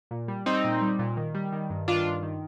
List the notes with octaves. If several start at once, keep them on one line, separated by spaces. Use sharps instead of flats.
A#2
G3
G3 C4 D#4
A#2
G3
A#2
D#3
G3
D#3
G2
D#3 D4 F4
G2
D#3